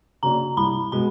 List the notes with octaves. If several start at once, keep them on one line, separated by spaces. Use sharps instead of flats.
C#3 F#3 A#3 D4 A#5
C2 B5
B2 G#3 B3 B5